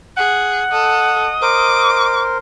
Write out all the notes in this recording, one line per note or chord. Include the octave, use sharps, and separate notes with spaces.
G#4 F#5
A4 D#5
A#4 C5 D6